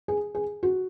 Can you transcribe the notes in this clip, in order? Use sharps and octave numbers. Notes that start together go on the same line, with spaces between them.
G#4
G#4
F#4